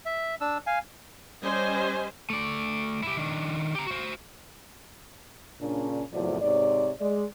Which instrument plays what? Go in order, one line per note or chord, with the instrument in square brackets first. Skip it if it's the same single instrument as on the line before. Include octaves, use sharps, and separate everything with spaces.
[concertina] E5
D4 E6
F5 G#5
[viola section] G3 C#4 C5 D#5 G#5
[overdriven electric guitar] A3 D5
E4 G4
D#3 D4
G4 A#5
F#4 C5
[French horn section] A#2 C#3 C#4 D4
E2 A2 C3 F3 F#3 D5
G#2 C3 C#5 D5
G#3 D5